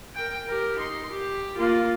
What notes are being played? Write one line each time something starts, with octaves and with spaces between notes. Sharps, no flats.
A#4 G5
G4 A#4
D#4 C6
G4
A#3 F4